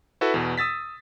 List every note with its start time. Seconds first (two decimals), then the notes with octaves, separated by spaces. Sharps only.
0.21 E4 F#4 A4 B4
0.34 E2 B2
0.58 D#6 E6 A6 B6